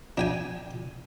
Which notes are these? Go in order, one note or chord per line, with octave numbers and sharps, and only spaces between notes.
D4 G5 G#5